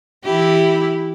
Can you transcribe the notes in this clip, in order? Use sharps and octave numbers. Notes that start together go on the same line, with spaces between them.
E3 E4 G4